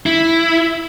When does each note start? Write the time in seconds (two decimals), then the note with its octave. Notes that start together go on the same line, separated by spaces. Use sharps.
0.06 E4